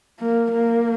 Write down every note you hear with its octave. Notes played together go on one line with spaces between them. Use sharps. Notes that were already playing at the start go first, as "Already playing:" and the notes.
A#3
A#3